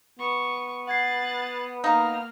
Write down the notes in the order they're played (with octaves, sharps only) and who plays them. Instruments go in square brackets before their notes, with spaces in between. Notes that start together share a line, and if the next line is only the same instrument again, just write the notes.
[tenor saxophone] B3 [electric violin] C#6
[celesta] F#5 G#6 C7 [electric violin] F#6 A6
[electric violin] A#3 F6 [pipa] D#4 [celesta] F5 A#5